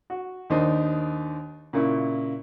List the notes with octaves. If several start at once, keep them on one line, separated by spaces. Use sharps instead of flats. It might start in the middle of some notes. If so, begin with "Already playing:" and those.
F#4
D#2 D#3 D4 D#4 C5
A#2 C#3 E4